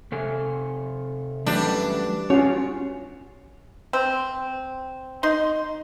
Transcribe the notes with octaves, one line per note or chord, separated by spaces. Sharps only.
C3 A4 G#5
F#2 E3 G3 A3 D4 B4
C#4 F4 F#4 C#5
C4
D#4 C6